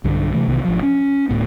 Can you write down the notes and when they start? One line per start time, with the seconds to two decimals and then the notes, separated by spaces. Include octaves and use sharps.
0.04 B1 G2 D3
0.33 C3 E3 A3
0.48 B1 C3 D#3 B3
0.65 G#1 F3
0.83 C#4
1.29 D1 C#2 A2 B3